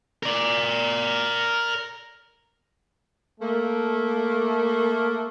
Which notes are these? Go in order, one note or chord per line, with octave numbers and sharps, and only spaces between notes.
A#4 D5
A3 A#3